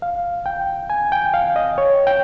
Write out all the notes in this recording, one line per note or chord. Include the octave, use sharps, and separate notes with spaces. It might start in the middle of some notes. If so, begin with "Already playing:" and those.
F5
G5
G#5
G5
F5
D#5
C#5
G5